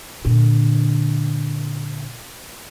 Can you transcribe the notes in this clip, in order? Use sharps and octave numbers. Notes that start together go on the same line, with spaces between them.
A#2 D3